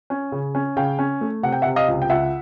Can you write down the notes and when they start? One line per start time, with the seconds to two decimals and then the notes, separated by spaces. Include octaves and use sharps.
0.10 C#4
0.32 C#3
0.55 C#4
0.77 C#3 F5 G5
0.99 C#4
1.21 A3
1.43 C3 F#5
1.52 G5
1.62 E5 F#5
1.66 C3
1.76 D#5 F5
1.88 C#2
2.02 G5
2.10 C#2 E5 F#5